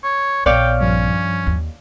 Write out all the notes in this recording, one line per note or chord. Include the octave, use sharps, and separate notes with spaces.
C#5
A#1 B3 C#5 D5 F5 G5
G2 F3 C#4
D#2